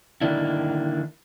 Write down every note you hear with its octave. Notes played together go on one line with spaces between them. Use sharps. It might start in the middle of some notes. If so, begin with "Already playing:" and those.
D3 D#3 A#3 D4 E4